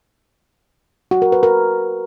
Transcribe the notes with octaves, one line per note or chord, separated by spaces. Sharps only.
F#4
A#4
B4
A#4